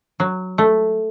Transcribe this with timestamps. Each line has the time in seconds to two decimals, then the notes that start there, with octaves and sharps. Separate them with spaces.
0.20 F#3
0.58 A3